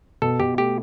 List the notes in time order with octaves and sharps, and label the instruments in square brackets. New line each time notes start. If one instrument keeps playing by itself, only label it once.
[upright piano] B2 [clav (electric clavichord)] A4
[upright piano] B2 [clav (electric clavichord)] G4
[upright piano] A3 [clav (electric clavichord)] G4